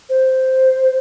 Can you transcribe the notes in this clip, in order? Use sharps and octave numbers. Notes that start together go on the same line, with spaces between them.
C5